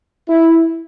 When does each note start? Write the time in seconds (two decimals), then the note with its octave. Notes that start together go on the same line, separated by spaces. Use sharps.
0.28 E4